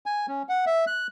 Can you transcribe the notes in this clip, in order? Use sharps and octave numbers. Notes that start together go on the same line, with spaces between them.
G#5
C#4
F#5
E5
F#6